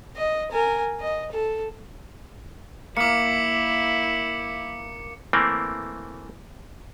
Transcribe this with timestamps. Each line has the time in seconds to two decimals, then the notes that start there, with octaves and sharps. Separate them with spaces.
0.16 D#5
0.51 A#4 G#5
1.01 D#5
1.32 A4
2.97 A#3 E4 D6 C#7
5.33 E3 A3 A#3 C4